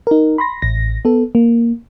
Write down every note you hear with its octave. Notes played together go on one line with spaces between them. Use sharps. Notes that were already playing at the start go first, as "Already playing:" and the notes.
D#4 A#4
B5 C6 A#6
A1 A#6
B3 A4
A#3